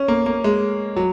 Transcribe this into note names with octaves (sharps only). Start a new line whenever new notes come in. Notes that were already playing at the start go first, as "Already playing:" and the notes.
Already playing: C#4
A#3
A#3
G#3
F#3